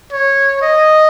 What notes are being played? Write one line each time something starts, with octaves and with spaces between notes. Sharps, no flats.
C#5
D#5